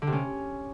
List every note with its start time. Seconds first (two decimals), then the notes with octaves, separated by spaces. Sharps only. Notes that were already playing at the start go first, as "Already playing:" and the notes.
0.02 D3
0.07 C3
0.13 C#4